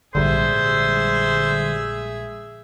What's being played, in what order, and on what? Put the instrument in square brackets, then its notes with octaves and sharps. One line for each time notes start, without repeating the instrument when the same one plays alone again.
[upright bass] A#1 G#2 [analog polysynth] D3 G3 [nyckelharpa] G#4 E5 [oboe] C5